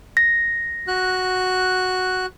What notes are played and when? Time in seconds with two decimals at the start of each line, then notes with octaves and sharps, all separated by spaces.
0.17 A#6
0.88 F#4 F#6